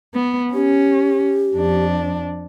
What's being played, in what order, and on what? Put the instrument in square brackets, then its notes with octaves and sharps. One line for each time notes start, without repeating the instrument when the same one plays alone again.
[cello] B3
[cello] C#4 [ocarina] G4
[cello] F2 D4